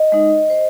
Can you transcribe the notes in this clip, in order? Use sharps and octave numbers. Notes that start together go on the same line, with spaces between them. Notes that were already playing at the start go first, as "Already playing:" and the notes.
Already playing: D#5
G#3 D#4
C5